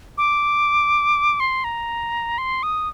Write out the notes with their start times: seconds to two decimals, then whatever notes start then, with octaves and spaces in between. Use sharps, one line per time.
0.18 D6
1.40 C6
1.64 A#5
2.38 C6
2.63 D#6